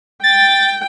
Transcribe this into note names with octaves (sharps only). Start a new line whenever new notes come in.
G5 A6